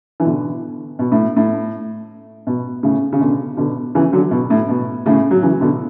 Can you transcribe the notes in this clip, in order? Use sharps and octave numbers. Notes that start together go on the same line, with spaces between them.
E3
B2 D3
B2
A2
A2
B2
A2 C#3
C#3
B2 D3
B2 D3
C#3 E3
D3 F#3
B2
A2
B2
A2 C#3
F#3
C#3 E3
B2 D3